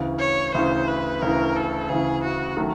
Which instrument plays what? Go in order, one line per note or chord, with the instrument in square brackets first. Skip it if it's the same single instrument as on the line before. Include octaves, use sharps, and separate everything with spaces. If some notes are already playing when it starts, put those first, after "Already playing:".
Already playing: [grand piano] D2 C#3 E3
[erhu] C#5
[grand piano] D2 C#3 E3 [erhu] C5
[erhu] B4
[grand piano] D2 C#3 E3 [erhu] A#4
[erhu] A4
[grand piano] D2 C#3 E3 [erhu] G#4
[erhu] F#4
[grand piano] D#3 F#3 A3